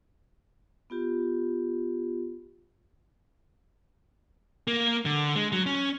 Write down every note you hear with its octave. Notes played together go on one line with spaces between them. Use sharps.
B3 F4 G4
A#3
D3
G#3
F#3
C#4